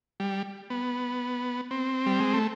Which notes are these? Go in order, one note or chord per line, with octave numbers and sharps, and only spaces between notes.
G3
B3
C4
G3
G#3
A3